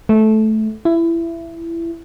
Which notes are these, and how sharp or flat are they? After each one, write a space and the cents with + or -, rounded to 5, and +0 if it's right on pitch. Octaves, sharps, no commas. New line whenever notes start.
A3 -15
E4 +20